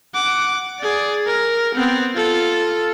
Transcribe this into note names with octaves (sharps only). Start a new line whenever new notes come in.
F#5 D6
G#4 D5
A#4
B3 C4
F4 A4